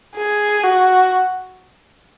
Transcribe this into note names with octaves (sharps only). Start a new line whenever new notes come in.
G#4
F#4